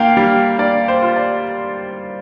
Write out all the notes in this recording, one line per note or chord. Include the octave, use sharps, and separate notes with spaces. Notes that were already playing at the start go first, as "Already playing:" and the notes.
Already playing: A#3 F4 F5 G5
G3
A#3 D5
C5
F4
D5